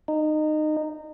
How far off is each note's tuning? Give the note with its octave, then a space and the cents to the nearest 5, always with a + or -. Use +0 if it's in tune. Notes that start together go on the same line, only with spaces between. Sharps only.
D#4 -20